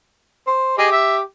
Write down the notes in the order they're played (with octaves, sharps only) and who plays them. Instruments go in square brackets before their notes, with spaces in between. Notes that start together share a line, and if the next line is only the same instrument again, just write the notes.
[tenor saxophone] C5
[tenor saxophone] G4 [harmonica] G#4 D#5
[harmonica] E5